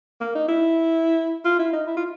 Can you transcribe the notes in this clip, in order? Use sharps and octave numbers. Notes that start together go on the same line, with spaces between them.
A#3
D#4
E4
F4
E4
D#4
E4
F4